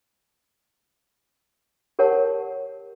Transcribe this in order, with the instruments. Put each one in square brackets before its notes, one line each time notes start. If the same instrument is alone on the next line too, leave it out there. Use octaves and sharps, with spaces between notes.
[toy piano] G4 A#4 C#5 F#5 A5